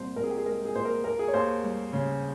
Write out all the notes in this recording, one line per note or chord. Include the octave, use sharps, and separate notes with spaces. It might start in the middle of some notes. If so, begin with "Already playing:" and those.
Already playing: C2 A#2 C5
C2 A#4
G#4
G4
G#4
G#3 A#4
G#4
A#2 C5
A#4
D#2 A#4
G#4
C#5
D#2 C5
G3
C#3